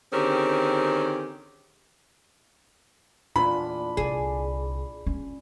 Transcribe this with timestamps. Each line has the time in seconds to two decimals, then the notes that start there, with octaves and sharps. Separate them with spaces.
0.13 D3 D#3 C4 C#4 G4 G#4
3.36 E2 A#2 D4 F4 B5
3.97 C2 G#4 D5
5.06 C#4